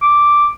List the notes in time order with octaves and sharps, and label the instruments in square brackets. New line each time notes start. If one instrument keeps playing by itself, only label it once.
[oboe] D6